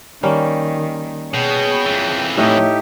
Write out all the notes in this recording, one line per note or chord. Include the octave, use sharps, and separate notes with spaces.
D#3 G3 A#3 C#4
B2 G#4 C#5 G5
F2 E3
A2 A3 D#4 G4 C#5 D#5 E5